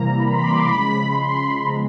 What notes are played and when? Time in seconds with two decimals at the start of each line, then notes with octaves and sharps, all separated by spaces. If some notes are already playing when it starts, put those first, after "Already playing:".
Already playing: C3 E3 G3 A#3 A#5
0.19 B5
0.32 C6
0.44 D6
0.56 C6
0.68 C#3 F3 G#3 B5
1.08 C6
1.17 B5
1.66 C#3 F3 G#3 B3 A#5